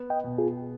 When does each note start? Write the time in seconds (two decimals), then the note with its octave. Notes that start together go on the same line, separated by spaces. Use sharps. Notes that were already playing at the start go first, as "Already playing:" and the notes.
Already playing: B3
0.10 D#5 G5
0.24 B2
0.38 F4 G#4